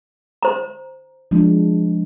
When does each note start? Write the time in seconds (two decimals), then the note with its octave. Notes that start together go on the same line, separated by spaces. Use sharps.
0.43 C5 A#5
1.31 F3 G#3 D4